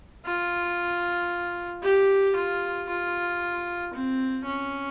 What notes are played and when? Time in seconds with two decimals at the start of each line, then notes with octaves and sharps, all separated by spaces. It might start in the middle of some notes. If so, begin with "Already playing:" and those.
0.26 F4
1.83 G4
2.36 F4
2.89 F4
3.94 C4
4.45 C#4